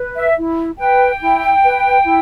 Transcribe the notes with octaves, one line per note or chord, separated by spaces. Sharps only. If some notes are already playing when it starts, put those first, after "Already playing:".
Already playing: B4
E5
E4
B4 G5
E4
B4
E4